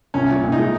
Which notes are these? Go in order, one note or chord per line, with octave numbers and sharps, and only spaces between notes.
C2 C#4
A#2
C2
D#4
G#3